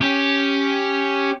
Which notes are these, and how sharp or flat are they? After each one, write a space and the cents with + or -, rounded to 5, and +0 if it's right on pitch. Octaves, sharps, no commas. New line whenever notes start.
C#4 +0 G4 +0